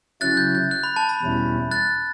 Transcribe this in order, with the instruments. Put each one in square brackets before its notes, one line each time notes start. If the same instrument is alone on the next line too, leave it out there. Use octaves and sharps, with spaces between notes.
[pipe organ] C#3 F#3 C#4 E4 [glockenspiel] F#6 A6
[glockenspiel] G6
G6
F#6
B5
A5
B5
[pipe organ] E2 B2 G3 C#4 E4
[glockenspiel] F#6 A6